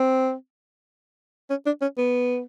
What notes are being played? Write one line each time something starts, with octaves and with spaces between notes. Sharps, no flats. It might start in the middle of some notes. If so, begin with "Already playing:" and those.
Already playing: C4
C#4
D4
C#4
B3